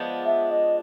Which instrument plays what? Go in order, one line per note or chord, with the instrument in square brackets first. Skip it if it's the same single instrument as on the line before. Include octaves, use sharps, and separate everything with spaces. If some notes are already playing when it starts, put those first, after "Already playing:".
Already playing: [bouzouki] F3 G#3 B3 D4
[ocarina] E5
D#5